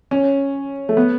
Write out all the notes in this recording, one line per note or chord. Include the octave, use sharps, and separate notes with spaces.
C#4
A3
B3